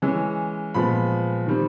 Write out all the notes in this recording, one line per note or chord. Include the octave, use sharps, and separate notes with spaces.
E3 G#3 C#4
A#2 F3 G#3 B3 B5
D#3 G3 C4